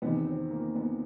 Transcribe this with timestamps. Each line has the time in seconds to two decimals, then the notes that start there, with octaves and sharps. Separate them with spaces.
0.02 E2 C3 D#3 B3
0.26 C4
0.51 A#3
0.75 B3